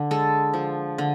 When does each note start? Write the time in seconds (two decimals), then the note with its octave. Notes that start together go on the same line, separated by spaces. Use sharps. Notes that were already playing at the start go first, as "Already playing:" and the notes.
Already playing: D3
0.11 G#3 A4
0.53 F3
0.98 D3